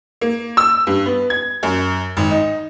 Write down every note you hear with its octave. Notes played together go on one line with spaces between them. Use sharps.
A#3
E6
G2
B3
G#6
F#2
G#1
D#4